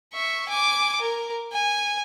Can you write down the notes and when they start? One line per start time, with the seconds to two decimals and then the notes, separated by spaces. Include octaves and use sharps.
0.14 E5 C#6
0.49 G#5 D6
1.01 A#4
1.53 G#5